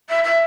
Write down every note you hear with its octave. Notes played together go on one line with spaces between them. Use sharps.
E5
E5